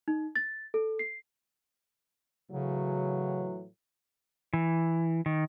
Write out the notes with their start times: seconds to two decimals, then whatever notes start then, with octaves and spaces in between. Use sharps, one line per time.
0.08 D#4
0.36 A6
0.74 A4
0.99 C7
2.51 A2 C#3 E3 F#3
4.53 E3
5.26 D#3